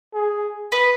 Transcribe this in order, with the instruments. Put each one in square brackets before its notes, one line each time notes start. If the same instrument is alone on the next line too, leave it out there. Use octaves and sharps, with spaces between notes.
[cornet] G#4
[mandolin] B4 D#5